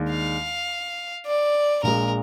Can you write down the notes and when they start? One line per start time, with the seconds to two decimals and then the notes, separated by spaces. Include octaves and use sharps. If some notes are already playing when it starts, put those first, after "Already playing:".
Already playing: D#2 D#3 G#3 D4
0.10 F5
1.26 D5
1.83 A#1 A#2 G#3 A#4